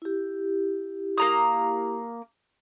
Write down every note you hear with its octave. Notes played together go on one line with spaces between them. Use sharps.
E4 G4
A#3 A#5 D#6